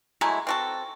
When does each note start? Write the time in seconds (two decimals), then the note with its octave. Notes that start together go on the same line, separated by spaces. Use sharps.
0.21 F#3 G#3 A3 E4
0.47 C4 F#4 A4